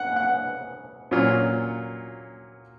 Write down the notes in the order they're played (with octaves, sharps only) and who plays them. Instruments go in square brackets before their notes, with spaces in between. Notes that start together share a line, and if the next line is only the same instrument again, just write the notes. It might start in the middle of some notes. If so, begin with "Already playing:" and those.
Already playing: [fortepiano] F#5
F#5
A#2 F#3 C#4 F4